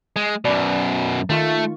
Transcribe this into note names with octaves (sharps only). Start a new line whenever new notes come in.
G#3
F#2 B2 D5 B5
D#3 A3 F4 C#6